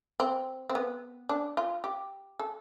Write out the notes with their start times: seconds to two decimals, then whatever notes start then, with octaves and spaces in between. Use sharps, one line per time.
0.20 C4
0.69 C4
0.75 B3
1.29 D4
1.57 F4
1.84 G4
2.39 A4